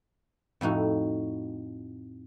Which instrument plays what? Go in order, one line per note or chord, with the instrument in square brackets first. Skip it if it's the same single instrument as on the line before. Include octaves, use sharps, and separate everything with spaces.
[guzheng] F2 A2 D#4 F#4